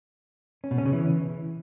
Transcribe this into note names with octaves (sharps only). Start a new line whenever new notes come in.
C#4
B2
C#4
C#3
E3